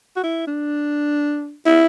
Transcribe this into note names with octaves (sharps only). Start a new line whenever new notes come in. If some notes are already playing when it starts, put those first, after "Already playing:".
F#4
E4
D4
E4